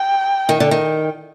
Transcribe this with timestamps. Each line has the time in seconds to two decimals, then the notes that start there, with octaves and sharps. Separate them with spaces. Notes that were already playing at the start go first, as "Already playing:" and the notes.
Already playing: G5
0.49 D#3
0.60 D3
0.71 D#3